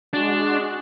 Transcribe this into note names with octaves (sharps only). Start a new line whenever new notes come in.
G#3 D4 F#4